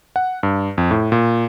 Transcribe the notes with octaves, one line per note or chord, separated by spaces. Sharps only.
F#5
G2
F2
A2
A#2